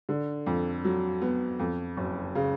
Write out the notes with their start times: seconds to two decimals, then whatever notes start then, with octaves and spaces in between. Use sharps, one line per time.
0.09 D3
0.46 F2
0.85 F#3
1.22 B3
1.59 F2
1.97 F#1
2.35 C#3